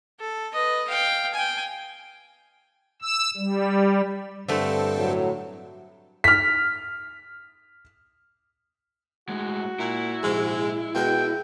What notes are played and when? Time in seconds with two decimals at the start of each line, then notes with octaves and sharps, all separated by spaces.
0.20 A4
0.52 B4 D#5
0.88 F5 G5
1.34 G5 G#5
3.02 E6
3.37 G3
4.48 G2 D3 A3 C4 A4
4.98 A2 F#3
6.24 F6 B6
9.29 A2 G#3 F#4
9.79 A#2 E4
10.23 A#1 G#2 C3 G#3
10.95 B2 G#3 A#4 B4 G5